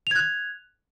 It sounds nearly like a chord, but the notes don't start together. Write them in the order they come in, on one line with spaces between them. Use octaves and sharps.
F7 G#6 F#6